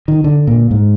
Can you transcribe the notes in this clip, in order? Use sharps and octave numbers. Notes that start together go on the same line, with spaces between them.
D#3
D3
A#2
G#2